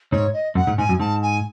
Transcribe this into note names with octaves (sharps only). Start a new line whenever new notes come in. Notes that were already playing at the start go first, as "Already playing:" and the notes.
G#2 C#5
D#5
F#2 F#5
G#2
G#2 G#5
F#2
G#2 A5
G#5